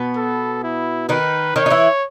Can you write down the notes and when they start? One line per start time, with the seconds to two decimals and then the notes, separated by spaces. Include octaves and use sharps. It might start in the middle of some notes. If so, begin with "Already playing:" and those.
Already playing: B2 B3
0.16 A4
0.64 E4
1.09 D#3 D#4 B4
1.56 D#3 D#4 C#5
1.66 D#4
1.70 E3 E4